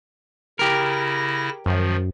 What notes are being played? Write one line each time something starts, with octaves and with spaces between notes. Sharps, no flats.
C#3 E4 G4 A#4 A#6
F#2 D#3 F3